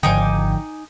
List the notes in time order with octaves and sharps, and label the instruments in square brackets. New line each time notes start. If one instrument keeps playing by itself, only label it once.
[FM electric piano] G#1 G5 [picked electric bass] D3 F3 [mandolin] D#4 G#5 D6